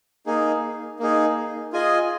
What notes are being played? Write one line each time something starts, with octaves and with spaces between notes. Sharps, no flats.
A#3 D#4 G#4
A#3 D#4 G#4
F4 G#4 D#5 G#5